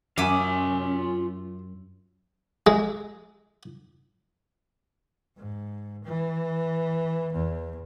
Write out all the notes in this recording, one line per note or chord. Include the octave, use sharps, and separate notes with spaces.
F#2 C#4 F4 E5 G#5 D6 D#6
G#3
G#2
E3
E2